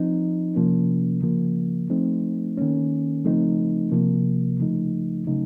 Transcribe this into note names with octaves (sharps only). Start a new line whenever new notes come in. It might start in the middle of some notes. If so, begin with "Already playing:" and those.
Already playing: F3 C4 D#4
C3 F3 A#3 C#4
C#3 F3 A#3
F3 A3 C4 D#4
D#3 A#3 C#4
C#3 F3 A3 C4 D#4
C3 F3 A#3
C#3 F3 A3 D#4
C#3 F#3 A3 D#4